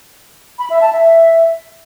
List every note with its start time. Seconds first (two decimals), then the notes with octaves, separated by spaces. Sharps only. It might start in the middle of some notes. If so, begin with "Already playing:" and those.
0.59 B5
0.70 E5
0.81 A5
0.93 E5